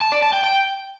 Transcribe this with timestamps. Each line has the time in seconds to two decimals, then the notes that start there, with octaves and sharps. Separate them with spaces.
0.01 A5
0.12 D5
0.22 A5
0.33 G5
0.44 G5